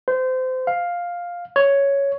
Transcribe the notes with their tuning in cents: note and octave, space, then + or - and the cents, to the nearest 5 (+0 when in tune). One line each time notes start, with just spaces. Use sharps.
C5 -25
F5 +5
C#5 +5